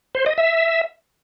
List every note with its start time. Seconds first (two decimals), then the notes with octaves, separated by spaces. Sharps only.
0.15 C5
0.26 D#5
0.38 E5